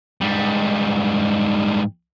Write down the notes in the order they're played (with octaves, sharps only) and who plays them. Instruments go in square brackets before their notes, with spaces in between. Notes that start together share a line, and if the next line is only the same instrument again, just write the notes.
[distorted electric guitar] G#2 G3